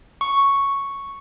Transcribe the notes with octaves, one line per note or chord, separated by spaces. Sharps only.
C#6